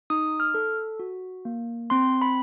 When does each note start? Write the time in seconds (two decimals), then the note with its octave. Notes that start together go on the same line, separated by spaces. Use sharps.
0.10 D#4 D#6
0.40 F6
0.54 A4
1.00 F#4
1.45 A#3
1.90 C4 C6
2.22 B5